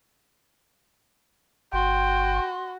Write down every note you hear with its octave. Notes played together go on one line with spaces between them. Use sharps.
G1 F#4 G5 C6